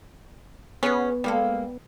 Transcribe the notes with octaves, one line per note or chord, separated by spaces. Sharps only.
B3 C#4 G#4 B4
G3 G#3 A#3 A4